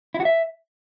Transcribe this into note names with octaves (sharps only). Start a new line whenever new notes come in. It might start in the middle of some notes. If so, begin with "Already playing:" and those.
E4
F#4
E5